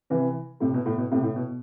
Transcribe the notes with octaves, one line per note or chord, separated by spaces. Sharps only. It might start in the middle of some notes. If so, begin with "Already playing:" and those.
C3 E3
A2 C3
B2
A2
B2
A2 C3
A2
B2